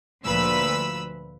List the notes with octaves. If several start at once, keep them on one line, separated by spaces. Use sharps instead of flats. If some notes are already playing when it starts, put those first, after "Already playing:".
D2 A#2 F3 B4 B5 E6